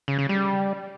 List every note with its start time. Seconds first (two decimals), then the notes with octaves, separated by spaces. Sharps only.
0.08 C#3
0.19 C#3
0.29 G3